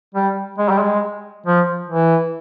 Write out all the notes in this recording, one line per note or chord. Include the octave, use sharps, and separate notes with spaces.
G3
G#3
G3
G#3
F3
E3